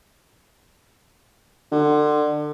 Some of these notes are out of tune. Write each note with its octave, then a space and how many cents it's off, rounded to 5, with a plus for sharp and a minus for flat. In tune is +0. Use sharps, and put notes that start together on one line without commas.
D3 +30